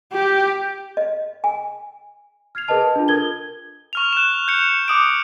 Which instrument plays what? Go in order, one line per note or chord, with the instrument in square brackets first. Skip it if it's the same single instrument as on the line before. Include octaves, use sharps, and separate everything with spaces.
[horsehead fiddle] G4
[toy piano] D#5
G#5
[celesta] F6 G#6 C7 F7
G#4 A#4 B4 D#5 A5 F6
D4 F4
A4 A#4 G#6 G7
[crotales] C#6 F6 F7
F#6 E7
G6 C#7 F7
D6 D#6 D7